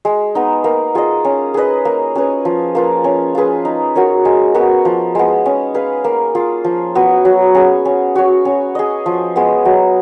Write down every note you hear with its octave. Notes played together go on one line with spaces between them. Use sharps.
G#3
B3 D#4
A#3
F4 G#4 D#5
C#4
G#4 B4 D#5
A#3
C#4 G#4 B4
F3
A#3 F4 B4
C#4
F4 G#4 B4
D#4
F#4 A#4 C#5
G#3
B3 F#4 A#4
F3
G#3 B3
C#4
G#4 B4 F5
A#3
F4 G#4
F3
B3 F#4
F#3
C#4 G#4
C#4
F#4 C#5
C#4
G#4 D#5
F3
G#3 B3
F#3